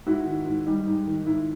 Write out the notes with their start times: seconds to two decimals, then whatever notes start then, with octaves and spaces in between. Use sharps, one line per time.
0.06 G#2 E4 F#4
0.25 D#3
0.46 G#2
0.66 G3 D#4
0.86 G#2
1.07 D#3
1.26 G#2 E4